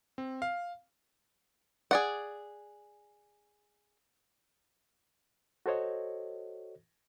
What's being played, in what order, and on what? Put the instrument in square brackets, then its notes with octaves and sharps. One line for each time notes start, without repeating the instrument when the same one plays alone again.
[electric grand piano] C4
F5
[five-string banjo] G#4 D5 F#5
[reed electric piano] F#4 A4 C5 C#5 D#5